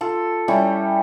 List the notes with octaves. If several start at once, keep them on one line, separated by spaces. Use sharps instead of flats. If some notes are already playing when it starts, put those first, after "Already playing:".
F4 A4
G3 C#4 E4